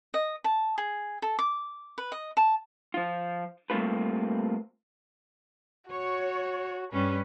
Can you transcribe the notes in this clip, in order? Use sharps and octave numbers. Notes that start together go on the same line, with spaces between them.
D#5
A5
G#4
A4
D6
B4
D#5
A5
F3 F4
G3 A3 A#3 C4 F4 B4
F#4 C#5
G2 G3 C#4 B4